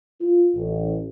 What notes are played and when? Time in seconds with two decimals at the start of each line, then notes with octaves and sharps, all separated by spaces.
0.21 F4
0.55 A1